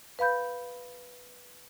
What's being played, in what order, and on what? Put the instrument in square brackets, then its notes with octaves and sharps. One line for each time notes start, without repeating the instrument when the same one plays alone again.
[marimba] B4 F5 B5 G6